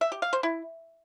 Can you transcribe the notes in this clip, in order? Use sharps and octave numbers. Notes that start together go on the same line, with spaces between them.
E5
G4
F5
C5
E4